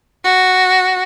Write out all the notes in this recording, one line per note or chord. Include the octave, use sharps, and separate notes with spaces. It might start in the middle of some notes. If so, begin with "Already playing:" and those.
F#4